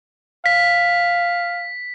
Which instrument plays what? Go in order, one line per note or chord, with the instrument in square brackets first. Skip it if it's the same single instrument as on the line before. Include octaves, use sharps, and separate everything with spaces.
[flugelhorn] F5 [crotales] B6